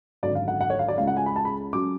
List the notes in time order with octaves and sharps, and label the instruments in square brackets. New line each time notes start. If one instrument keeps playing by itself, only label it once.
[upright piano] G#1 F#2 D3 D5
F5
F#5
F#5
C#5
F5
D5
C#2 C#3 G#3 C#4 F5
F#5
G#5
B5
A5
B5
F#3 C#4 D6